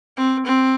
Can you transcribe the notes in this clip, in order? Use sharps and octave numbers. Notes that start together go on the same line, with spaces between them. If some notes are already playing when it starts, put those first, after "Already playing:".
C4
C4